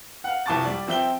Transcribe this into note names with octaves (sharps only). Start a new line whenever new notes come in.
F5 F#5
C2 F2 A5 C#6 D6 A6
G3 D5
F3 C4 E5 G5 G7